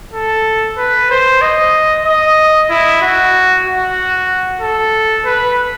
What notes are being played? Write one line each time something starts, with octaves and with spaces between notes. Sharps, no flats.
A4
B4
C5
D#5
D#5
E4
F#4
F#4
A4
B4